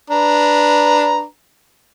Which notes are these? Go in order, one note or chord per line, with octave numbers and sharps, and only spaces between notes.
D4 B4 A#5